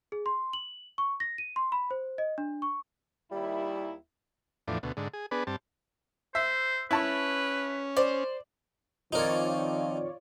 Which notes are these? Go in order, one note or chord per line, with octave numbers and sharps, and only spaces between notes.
G#4
C6
F#7
C#6
A#6
D#7
C6
B5
C5
D#5
D4
C#6
D#2 G3 E4
E2 A2 F3 D4
D2 B2
G#2 D3
G#4
B3 D4 G#4 B4
G2 C4 A5
C5 E5
C#4 E4 B4 A5 C#6
C5 D5
D#3 F3 C4 D#4 F4 A#4 C#5 D5